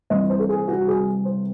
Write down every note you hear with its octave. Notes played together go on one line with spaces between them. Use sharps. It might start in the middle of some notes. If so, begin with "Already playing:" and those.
C2 C3 E3 D#5
C5
A4
G#4
F#4
G#4
C5